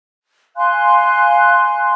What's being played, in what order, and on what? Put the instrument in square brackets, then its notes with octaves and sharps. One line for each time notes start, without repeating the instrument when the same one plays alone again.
[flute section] F5 G#5 C6 F#6